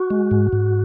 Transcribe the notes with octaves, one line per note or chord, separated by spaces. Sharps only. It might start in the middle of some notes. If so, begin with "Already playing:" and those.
Already playing: F#4
G#3
G#2
G#2